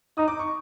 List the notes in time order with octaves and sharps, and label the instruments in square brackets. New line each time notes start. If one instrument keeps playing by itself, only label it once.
[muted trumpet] D#4 [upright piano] D#6
[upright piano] D6
C#6